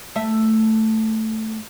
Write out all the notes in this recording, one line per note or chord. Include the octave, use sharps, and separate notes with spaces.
A3 E5